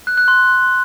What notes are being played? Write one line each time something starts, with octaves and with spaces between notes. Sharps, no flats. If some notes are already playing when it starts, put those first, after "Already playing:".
F#6
F#6
C6